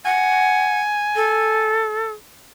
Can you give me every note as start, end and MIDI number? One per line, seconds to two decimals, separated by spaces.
0.05 0.81 78
0.05 1.80 80
1.16 2.13 69